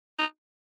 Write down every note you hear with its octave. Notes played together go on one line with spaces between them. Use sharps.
D#4